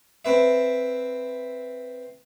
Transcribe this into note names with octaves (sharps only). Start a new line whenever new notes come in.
C4 B4 E5